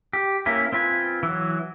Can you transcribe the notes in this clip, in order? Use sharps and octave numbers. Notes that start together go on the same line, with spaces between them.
G4
A#3 C#4 E4 B4
C4 F4 B4 G#5
E3 F#3